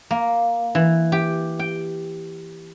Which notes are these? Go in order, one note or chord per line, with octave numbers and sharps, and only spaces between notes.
A#3
E3
G4
G5